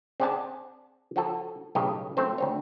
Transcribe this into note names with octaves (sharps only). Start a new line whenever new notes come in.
C4 G#4 D5 F#5 G#5 A5
F3 F#4 A4
B1 A2 C#3 G4 D#5 F5
F#3 A3 C4 C5
D2 C4 C#5